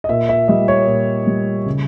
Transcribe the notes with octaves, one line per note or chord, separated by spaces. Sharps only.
D#5
A#2 E5
E5
G3 D#5
C#5
A#2
G3
C#3